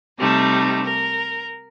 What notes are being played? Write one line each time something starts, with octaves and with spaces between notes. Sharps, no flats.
C3 G3 A3 D#4
A#4